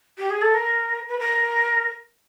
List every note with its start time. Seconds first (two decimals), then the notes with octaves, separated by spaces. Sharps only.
0.18 G4
0.30 G#4
0.41 A4
0.54 A#4
1.08 B4
1.19 A#4